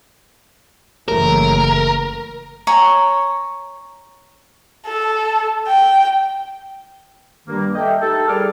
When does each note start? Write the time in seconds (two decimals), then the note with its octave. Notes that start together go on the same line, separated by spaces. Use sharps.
1.08 F#1 E3 A3 A#4
2.67 C#5 G#5 A#5 C#6
4.86 A4
5.68 G5
7.48 G2 D#3 G3 A#3
7.75 A4 D#5 E5 G5
8.01 A3 D#4 G4 A4
8.27 G3 G#4 A#4 D6 F6